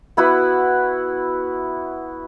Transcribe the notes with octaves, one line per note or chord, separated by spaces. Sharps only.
B3 E4 F#4 B4